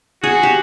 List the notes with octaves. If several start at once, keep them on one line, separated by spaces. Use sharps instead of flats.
F#4 G#4
G4